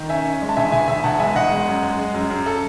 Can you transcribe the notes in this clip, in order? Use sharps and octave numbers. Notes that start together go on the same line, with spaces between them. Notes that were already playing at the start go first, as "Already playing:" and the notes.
Already playing: D#3
C#4 E5 G#5
C#4
G#3
A5
E1 E5 G#5
E1 E5 G#5
E1 E5 G#5
E1 F#5 A5
G#3 E5 G#5
E1 D#5 F#5
G#3
F#2
G#3
G#3
F#2
F#2
A4